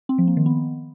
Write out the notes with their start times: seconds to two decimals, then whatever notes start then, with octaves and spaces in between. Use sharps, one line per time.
0.09 C4
0.18 F3
0.28 A#3
0.37 D#3
0.46 B3